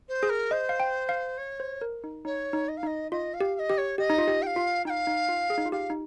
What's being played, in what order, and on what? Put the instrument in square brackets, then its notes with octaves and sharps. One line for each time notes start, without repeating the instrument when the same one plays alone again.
[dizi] C5
[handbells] G#4
[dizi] A#4
[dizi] C5 [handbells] D#5
[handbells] F5
G5
F5
[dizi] C#5
[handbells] C5
A#4
D#4
[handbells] D#4 [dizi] C#5
[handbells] D#4
[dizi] D#5
F5
[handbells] D#4 [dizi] D#5
[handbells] F4 [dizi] D#5
[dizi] F5
[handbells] G4
[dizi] F5
D#5
[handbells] G4
[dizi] C#5
[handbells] G4 [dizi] D#5
[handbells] D#4
F4
G4
[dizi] G5
F5
[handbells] F4
[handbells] D#4 [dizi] G5
[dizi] F5
[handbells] D#4
F4
G#4
D#4
F4
[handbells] G4 [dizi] F5
[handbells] D#4